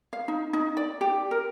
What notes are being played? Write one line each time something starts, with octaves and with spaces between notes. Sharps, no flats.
F5
D#4
D#4
D5
G4
A#4